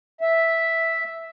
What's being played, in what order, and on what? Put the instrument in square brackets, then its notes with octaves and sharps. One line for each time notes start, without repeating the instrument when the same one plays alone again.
[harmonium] E5